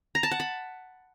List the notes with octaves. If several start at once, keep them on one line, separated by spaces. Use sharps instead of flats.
A#5
A5
F#5
B5